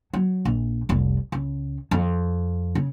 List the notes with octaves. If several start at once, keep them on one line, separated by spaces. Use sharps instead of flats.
F#3
A#1
F1 C2
C#2
F2
C#3